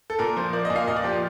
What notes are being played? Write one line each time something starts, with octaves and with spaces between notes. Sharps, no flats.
A4
A#2 A#4
F3 C5
A#3 D5
D#5
A#2
F5
A#2 D#5
D5
F3 G4
F4